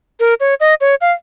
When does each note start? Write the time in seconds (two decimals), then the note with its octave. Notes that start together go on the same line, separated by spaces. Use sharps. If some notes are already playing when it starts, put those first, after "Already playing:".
0.20 A#4
0.40 C#5
0.60 D#5
0.81 C#5
1.01 F5